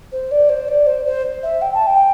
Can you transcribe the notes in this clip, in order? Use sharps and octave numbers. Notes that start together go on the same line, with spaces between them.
C5
D5
C5
D5
C5
C5
E5
G5
A5
G5